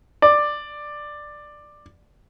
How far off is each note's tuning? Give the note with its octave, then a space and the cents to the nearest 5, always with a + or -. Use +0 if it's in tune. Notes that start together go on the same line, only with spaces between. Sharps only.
D5 +10